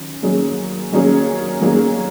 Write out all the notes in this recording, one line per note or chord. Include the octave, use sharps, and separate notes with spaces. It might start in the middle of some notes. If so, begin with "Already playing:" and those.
Already playing: D#3 F#3 C#4
D#3 F#3 A#3 C#4 G#4
D#3 F#3 A#3 C#4 G#4
D#3 F#3 A#3 C#4 G#4